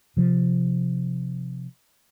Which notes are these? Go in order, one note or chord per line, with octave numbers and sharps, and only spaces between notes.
C3 F3